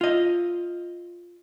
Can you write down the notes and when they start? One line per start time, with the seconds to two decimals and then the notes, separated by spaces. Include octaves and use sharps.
0.01 F4 D#5